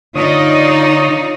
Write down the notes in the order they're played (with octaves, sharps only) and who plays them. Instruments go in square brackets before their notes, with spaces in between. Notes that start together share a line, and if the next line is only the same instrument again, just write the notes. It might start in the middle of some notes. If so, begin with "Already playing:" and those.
[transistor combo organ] D3 C#5 D#6 [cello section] D#4 F4 D5